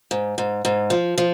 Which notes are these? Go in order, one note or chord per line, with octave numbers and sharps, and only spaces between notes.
G#2
G#2
G#2
F3
F3